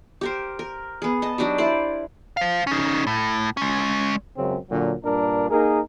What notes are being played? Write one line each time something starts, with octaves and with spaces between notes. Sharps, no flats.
G4 A#4 C5
A#4
B3 G#4
D#5 A5
F#3 D4 D#4 G4
E4 C5 D5
C5 F5
C#4 D#4
A2
G#3 C#4
C#2 F#2 C#3 C4
A#2 D3 F#3
G2 A#2 D4 A#4
A#3 D#4 G#4 A#4